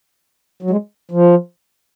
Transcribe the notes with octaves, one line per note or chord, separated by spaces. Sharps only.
F#3
G#3
F3